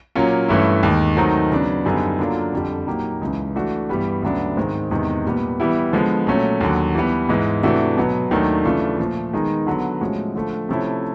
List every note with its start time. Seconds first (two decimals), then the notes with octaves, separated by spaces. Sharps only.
0.15 A#2 F#3 A#3 C#4 F4
0.48 G2 E3 A3 C#4 E4
0.83 D#2 D#3 G#3
1.17 D#3 F#3 A3 C4 D#4
1.51 C#3 F#3 B3 D4
1.85 F#2 D3 G3 B3 D#4
2.19 D3 F#3 A#3 D4 F4
2.53 F2 D3 G3
2.87 A#2 F#3 A#3 D#4 G4
3.21 C#2 C#3 E3
3.55 E3 A3 D4 F#4
3.89 G2 E3 G3 B3
4.22 D2 C#3 F#3 B3 D4
4.57 G#2 D#3 G#3 C4
4.91 E2 C3 D#3 G#3
5.26 A#2 G3 B3
5.60 E3 G3 B3 E4
5.92 D3 F3 G#3 B3
6.27 A#2 F#3 A3 C#4
6.61 D#2 D3 F#3
6.95 E3 G3 B3
7.29 G#2 E3 G#3
7.63 C3 E3 A3 D4 F#4
7.97 B2 F#3 B3
8.31 D#2 D#3 F#3 A3 D4
8.65 C#3 E3 A3 D4 F4
8.99 A#2 F3 A3
9.33 D#3 G#3 B3 D#4 G#4
9.66 D3 F#3 B3
10.01 A2 F3 G#3 C#4 F#4
10.35 D3 F3 A3
10.69 C3 F3 A3 C#4 E4